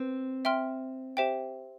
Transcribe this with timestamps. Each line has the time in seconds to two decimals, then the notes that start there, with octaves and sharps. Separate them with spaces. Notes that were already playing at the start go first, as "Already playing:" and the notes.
Already playing: C4 B4
0.45 E5 G5 C6 F6
1.17 G4 C5 E5 G5